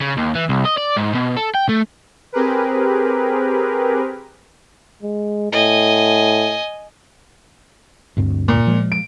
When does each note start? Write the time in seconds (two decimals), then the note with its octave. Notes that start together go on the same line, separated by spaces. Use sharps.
0.01 C#3
0.17 D#2
0.35 E3
0.49 C2
0.65 D#5
0.78 D5
0.97 G#2
1.15 B2
1.37 A4
1.54 G5
1.69 A3
2.32 C4 G4 G#4 A#4 B4
5.03 G#3
5.52 A2 D#5 G#5
8.17 D2 G2 C4
8.48 A#2
8.67 F3 G#3
8.92 D7